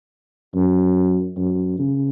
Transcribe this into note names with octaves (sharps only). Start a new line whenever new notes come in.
F#2
F#2
C#3